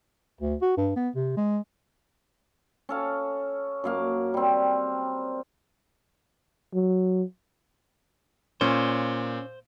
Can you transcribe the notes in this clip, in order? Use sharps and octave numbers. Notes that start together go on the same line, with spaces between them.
D2
F#4
G2
B3
C3
G#3
C#4 A4 F5
F#2 A#3 F5
G3 C4
F#3
A#2 C#4 C5